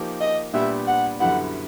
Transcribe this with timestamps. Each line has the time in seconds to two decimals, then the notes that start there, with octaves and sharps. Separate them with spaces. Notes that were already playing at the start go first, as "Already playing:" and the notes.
Already playing: F3 A#3 D#4 G4
0.21 D#5
0.54 A#2 G3 B3 D4 G4 E5
0.87 F#5
1.20 F#2 D3 G3 B3 E4 F#5